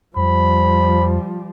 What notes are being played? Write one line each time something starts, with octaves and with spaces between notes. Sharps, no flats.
F2 F3 G3 C5 B5